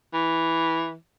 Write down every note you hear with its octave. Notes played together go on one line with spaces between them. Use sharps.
E3